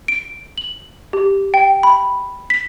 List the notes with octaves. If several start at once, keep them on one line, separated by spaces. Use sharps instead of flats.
D7
F#7
G4
G5
B5
B6